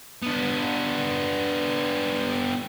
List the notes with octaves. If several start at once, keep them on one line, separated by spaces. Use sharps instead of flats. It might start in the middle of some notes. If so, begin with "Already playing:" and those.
B3 D4